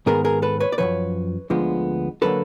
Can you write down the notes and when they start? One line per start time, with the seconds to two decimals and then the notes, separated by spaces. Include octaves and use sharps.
0.06 G#2 D#3 G#3 B3 G#4 A#4
0.25 G#4 A#4
0.42 A4 B4
0.60 B4 C#5
0.72 D5
0.78 F#2 C#3 F3 B4 C#5
1.50 D2 D3 F3 G#3 B3
2.22 D3 F#3 A#3 A4 B4